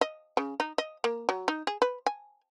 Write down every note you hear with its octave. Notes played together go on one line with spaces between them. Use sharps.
D#5
C#3
D#4
D#5
A#3
F#3
D#4
G#4
B4
G#5